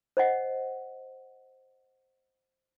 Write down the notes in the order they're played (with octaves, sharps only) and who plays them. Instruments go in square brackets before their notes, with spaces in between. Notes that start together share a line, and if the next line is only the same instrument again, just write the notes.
[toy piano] C5 D#5 F#5